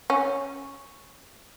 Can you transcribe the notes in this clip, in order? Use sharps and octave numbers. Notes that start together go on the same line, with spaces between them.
C#4